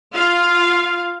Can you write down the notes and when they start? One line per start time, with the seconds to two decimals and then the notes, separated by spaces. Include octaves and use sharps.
0.14 F4 F5